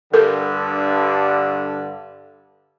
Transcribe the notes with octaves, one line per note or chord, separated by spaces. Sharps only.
G2 D3 A4 A#4